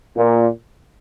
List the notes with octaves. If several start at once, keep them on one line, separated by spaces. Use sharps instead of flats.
A#2